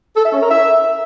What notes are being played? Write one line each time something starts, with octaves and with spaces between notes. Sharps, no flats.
A4
E5
C#4
A#4
E5